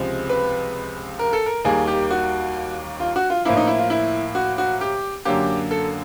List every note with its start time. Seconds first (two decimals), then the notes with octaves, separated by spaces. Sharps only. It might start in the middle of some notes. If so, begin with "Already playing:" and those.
Already playing: C#2 C3 F3 G#3
0.29 B4
1.19 A#4
1.33 A4
1.46 A#4
1.65 D#2 D#3 G3 A#3 G#4
1.88 G4
2.11 F#4
3.00 F4
3.16 F#4
3.30 F4
3.45 A2 F3 A#3 E4
3.57 D#4
3.67 E4
3.79 F4
3.90 E4
4.35 F#4
4.58 F#4
4.81 G4
5.25 F#2 D3 F#3 A#3 G4
5.71 A4